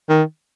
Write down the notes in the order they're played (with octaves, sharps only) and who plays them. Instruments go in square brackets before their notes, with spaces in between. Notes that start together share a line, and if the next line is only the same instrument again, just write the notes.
[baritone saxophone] D#3